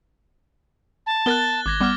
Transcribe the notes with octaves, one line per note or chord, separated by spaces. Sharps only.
A5
B3 A#4 F#6 A6 G7
G#1 D6 G#6 A#6
G3 B3 D6 F6